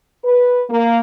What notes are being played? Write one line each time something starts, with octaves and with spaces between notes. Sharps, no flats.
B4
A#3